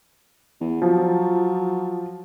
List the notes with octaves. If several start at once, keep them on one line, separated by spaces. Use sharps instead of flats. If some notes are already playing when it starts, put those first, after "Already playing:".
E2
F3 F#3